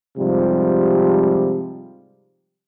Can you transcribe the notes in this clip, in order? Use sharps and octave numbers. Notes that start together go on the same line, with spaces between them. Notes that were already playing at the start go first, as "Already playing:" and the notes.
G#2 C3 F3 G3